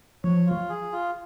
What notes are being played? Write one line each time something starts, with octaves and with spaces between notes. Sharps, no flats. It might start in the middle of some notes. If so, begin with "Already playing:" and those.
F3 C#5
F4
G#4
F4